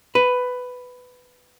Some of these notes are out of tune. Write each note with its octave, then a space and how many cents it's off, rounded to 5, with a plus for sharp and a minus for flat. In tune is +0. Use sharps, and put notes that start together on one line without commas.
B4 +10